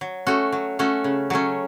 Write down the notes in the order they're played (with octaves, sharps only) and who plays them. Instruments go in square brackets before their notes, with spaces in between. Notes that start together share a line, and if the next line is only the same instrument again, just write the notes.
[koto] F#3
A3 C#4 F#4
F#3
A3 C#4 F#4
C#3
F#3 A3 C#4